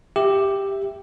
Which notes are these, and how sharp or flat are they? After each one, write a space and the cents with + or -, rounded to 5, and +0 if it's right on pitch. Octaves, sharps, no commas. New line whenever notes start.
G4 +5 E5 +0